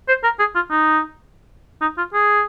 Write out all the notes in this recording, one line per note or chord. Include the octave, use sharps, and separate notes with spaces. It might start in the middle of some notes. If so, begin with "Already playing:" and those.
C5
A#4
G#4
F4
D#4
D#4
F4
G#4